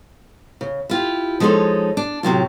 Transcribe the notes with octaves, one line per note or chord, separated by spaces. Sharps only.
C#3
E4 F4 G4
F3 G#3 D#4 E4 A4 C#5
D4
A2 C3 F#3 F4